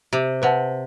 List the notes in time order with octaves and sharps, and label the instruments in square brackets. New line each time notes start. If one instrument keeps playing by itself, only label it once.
[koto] C3 [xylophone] G4
[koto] C3 [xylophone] B4 F#5 A5